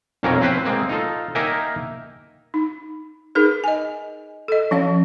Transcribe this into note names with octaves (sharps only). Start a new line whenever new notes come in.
B1 F2 A#3 C4 C#4 A#4
C4 E4 B4 C5
G#3 A#3 C4
D#4 F4 A4
A#3 D#4 A#4 E5 G5 G#5
D#4
D#4 G#4 A#4 B4
D#5 G#5
A4 D#5
F3 C#4 F5